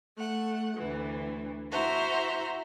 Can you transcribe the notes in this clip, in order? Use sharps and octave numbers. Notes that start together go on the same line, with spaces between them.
A3 F#5
D2 E3
E4 F#4 C5 E5 A#5